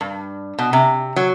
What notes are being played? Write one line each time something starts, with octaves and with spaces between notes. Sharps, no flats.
G2
B2
C3
F#3